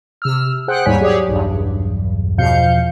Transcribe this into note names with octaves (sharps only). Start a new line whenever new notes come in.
C3 E6 F6
G#4 C5 F#5 G5 F#6
D#2 G#2 G3 C#5 G#5 B6
F#3 G4 G#4 C#5 D5
B1 E2 G2
E2 B2 F3 F5 G6 C#7